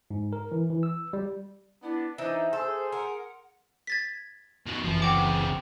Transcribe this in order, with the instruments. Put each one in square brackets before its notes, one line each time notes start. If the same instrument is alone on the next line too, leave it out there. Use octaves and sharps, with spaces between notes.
[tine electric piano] G#2
A#4
E3
E3
E6
G3
[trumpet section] B3 D4 [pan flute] E4
[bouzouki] E3 [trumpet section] D4 D#4 [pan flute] C5
[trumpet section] G#4 C6 [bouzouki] A4
[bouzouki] A#4 [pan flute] F#5
[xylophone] G#6 A6 B6
[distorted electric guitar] B2 D#3
[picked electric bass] F#1 C2 E3 [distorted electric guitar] F3
[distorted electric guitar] C#3 C4 [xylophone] F#5 G5 D6